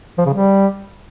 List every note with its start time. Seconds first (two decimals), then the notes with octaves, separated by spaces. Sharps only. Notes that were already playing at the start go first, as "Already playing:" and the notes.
0.18 F3
0.26 C#3
0.34 G3